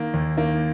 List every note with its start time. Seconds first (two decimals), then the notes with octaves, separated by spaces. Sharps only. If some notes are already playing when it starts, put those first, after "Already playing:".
Already playing: D#3 A#3
0.14 D#2
0.37 D#3 A#3